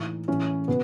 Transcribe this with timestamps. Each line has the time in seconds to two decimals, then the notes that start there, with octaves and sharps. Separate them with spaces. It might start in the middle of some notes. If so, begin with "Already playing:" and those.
Already playing: A2 E3 D#4
0.28 A2 E3 C#4
0.68 B2 B3